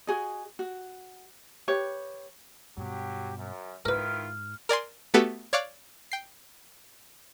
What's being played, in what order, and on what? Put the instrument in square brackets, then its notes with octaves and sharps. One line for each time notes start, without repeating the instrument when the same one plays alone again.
[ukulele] F#4 G#4 D#5
F#4
G4 B4 C#5
[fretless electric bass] G2 B2 [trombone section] F#3 G4
[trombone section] F#2
[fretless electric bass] G#2 [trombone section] D#3 E4 F4 [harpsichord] A#4 B4 [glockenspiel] F6
[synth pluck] A#4 D5 G#5 C6
A3 B3 F#4 G4 A4 B4
C#5 D5 F5 C#6 D6 F#6
G5 C7